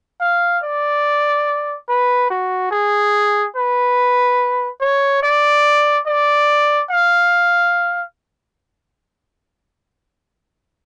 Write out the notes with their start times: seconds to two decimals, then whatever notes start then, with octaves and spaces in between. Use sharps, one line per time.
0.21 F5
0.63 D5
1.89 B4
2.30 F#4
2.71 G#4
3.56 B4
4.81 C#5
5.23 D5
6.07 D5
6.90 F5